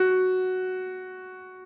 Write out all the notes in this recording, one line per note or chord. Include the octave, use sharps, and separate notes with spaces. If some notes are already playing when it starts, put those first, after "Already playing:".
Already playing: F#4